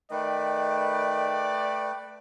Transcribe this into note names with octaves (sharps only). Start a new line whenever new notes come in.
D#3 A3 B4 D5 G5